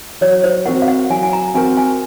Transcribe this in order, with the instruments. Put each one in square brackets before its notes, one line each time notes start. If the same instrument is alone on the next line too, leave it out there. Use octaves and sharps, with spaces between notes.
[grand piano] F#3 [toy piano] C#5
[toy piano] C5
[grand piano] C4 F#4 A#4 [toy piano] F#5
[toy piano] F5
F#5
[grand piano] F#3 [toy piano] G#5
[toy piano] G#5
A#5
[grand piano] C4 F#4 A#4 [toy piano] G#5
[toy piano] G#5